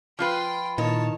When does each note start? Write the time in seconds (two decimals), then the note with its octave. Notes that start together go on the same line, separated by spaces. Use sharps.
0.19 F3 F4 B4 G5 C6
0.78 A#2 D#3 C#5 A5